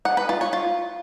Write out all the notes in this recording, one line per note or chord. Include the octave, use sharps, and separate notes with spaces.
F#5
B4
F4
C#5
F4